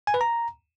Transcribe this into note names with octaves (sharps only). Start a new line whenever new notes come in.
G#5
B4
A#5